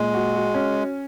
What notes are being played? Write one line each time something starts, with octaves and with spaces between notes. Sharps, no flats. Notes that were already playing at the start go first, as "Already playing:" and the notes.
Already playing: A#2 G#3
F#4
F#4
C#4